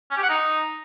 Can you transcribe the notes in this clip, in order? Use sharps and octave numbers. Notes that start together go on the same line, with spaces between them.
C#4
G4
F#5
D#4